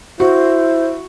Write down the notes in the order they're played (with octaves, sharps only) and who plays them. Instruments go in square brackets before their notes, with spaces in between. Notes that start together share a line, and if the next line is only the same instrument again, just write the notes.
[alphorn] E4 [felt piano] F#4 [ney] C5